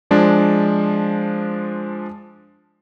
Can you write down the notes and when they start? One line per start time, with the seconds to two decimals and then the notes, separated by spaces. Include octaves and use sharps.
0.11 F3 G#3 D4